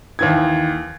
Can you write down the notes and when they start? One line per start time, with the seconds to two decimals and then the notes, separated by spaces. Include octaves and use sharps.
0.19 D#2 E3 G#6